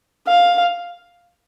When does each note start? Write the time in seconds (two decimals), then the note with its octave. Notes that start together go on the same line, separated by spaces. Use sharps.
0.27 F5